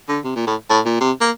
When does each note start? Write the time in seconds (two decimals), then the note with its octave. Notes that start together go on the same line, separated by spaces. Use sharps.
0.09 D3
0.24 C3
0.36 A#2
0.47 A2
0.70 A2
0.85 A#2
1.00 C3
1.20 A#3